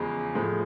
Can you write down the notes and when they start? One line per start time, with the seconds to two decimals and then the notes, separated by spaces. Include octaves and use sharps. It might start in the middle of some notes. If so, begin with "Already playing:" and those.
Already playing: E2 C#3 F3 G#3
0.35 A2 F3 G#3